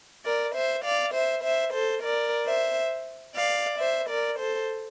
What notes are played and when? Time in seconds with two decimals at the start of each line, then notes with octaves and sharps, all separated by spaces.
0.25 A#4 D5
0.54 C5 E5
0.84 D5 F5
1.13 C5 E5
1.43 C5 E5
1.73 A4 C5
2.02 A#4 D5
2.47 C5 E5
3.36 D5 F5
3.79 C5 E5
4.09 A#4 D5
4.39 A4 C5